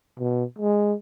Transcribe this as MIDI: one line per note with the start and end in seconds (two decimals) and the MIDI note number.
0.20 0.44 47
0.59 0.94 56